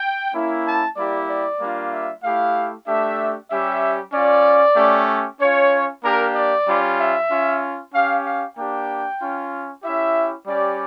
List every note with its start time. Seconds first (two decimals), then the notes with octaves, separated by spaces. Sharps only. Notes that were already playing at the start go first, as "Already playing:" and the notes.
Already playing: G5
0.33 A#3 C#4 E4
0.65 A5
0.97 G3 A#3 E4 G4 D5
1.28 D5
1.60 G3 A#3 D4 F4
1.91 E5
2.23 A3 E4 G4 F5
2.86 A3 D4 G4 E5
3.49 G3 C#4 G4 E5
4.13 C#4 F4 D5
4.76 A3 C#4 G4
5.39 C#4 F4 C#5
6.03 A#3 D4 G4 A#4
6.34 D5
6.67 G3 C#4 F4
6.98 E5
7.30 C#4 F4
7.93 C#4 G4 F5
8.24 F5
8.56 A#3 D4 G4 G5
9.20 C#4 F4
9.83 C#4 E4 G4 E5
10.47 G3 C#4 G4 D5